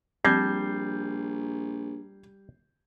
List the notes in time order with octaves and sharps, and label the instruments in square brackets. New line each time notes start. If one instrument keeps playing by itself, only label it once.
[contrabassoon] A#1 [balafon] F3 C4 [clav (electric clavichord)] G3 [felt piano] G6 G#6 C7